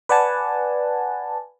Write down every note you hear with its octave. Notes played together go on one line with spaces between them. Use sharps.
B4 D5 F#5 G#5 A5